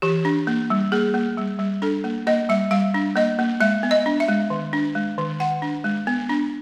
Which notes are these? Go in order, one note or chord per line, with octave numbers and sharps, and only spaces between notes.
E3 G4
D4
A#3
G3
A#3 G#4
A#3
G3
G3
D4 A4
A#3
A#3 D#5
G3 E5
G3 F5
D4
A#3 D#5
A#3
G#3 E5
B3
D#5
D4
E5
G#3
D#3
D4
G#3
D#3
D#3 F#5
D4
G#3
B3
D4